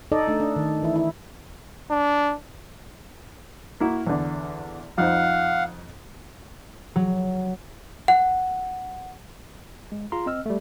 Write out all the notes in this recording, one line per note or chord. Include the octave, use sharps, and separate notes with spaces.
D#4 A4 D5 D#5
A3 D4 D#4
D4
D#3
E3 E4
E4
D4
A#3 E4 F#4
E2 D3
F2 D#4 C5 F5 F#5
F#3
F#5
G#3
F4 G#4 A#5 C6
C4 D#5 E6 F6
G3 A3